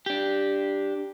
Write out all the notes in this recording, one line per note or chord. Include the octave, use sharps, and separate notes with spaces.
D4 G4